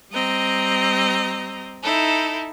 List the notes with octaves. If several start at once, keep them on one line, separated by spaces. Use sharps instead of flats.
G3 C4 D#5 A#5
D#4 E4 A4